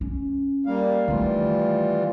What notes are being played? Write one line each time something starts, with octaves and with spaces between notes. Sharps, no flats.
C#4
G3 A#3 F5
D#3 E3 G3 A3 F4